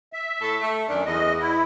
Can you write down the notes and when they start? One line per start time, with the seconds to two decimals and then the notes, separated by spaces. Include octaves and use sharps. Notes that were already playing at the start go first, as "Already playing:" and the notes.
0.13 E5
0.42 A2 A4
0.61 A3
0.88 F#2 D#3 D4
1.06 E2 D#5
1.40 E4